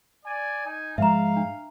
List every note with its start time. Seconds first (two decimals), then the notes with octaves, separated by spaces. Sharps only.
0.24 D5 G#5
0.66 D#4 G#5
0.98 G#2 F3 G#3 E5 F5 A#5
1.36 D4